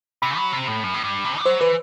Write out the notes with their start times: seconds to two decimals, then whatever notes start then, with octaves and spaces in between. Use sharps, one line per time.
0.22 C3 B5
0.37 F#3
0.53 C3
0.68 A2
0.83 F#2
0.94 A2
1.04 G2
1.25 C3
1.40 G3
1.46 F#3 C5
1.60 E3 B4